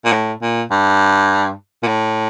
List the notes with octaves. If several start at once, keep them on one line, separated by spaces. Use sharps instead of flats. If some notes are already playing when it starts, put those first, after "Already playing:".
A#2
A2
A#2
G2
A#2
A2